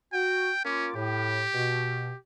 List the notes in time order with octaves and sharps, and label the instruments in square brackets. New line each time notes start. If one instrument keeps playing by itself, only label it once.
[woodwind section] F#4 [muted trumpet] G5
[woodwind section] A#3 F4 D6 [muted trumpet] C#4
[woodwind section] A2 [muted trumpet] G4
[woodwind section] B2